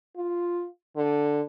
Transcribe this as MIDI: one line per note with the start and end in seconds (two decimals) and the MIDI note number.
0.16 0.67 65
0.96 1.41 50